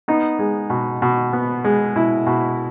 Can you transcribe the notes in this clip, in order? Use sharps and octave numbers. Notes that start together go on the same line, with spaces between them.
B3 D#4
G#3
B2
B2
B3
G#3
B2 E4
B2